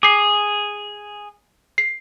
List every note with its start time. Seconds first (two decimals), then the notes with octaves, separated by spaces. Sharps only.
0.03 G#4 D6 C7
1.78 C7